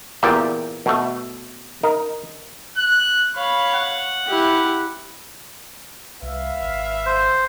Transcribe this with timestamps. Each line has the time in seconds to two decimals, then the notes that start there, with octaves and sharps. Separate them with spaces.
0.23 E2 A#2 G4 D5 E5
0.86 B2 A3
1.83 D#4 A#4
2.77 F#6
3.35 C#5 F5 B5
3.74 F#5
4.27 E4 G4
6.22 C2 B4 E5 F5
6.62 G#1
7.06 C5